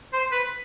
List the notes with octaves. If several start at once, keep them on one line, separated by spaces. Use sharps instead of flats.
C5
B4